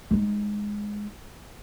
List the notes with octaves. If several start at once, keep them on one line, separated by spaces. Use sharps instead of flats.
G#3 D#4